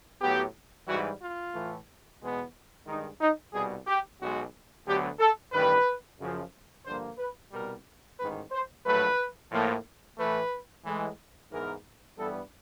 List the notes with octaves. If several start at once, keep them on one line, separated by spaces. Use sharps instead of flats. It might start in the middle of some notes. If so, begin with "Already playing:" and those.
A2 F#3 B3 G4
G#2 E3 G3 F#4
F4
A2 E3 A3
E2 B2 G#3 B3
G2 D#3 G#3 D#4
D#4
C2 B2 G3 G#4
G4
B1 B2 G#3 F#4
D2 D3 F#3 B3 G4
A4
A1 G2 D#3 G3 B4
F#2 C#3 F3
G2 D3 F3 A#3 C5
B4
C2 B2 G3 A#4
A1 G#2 D#3 B4
C5
A#1 A2 F#3 A3 B4
A2 F3 A#3
A2 E3 A3 B4
A2 E3 G#3
G#2 E3 G#3 B3 A#4
G2 E3 G3 B3 A4